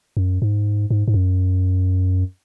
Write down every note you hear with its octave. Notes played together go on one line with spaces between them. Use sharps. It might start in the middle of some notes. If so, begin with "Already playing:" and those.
F#2
G#2
G#2
G#2
F#2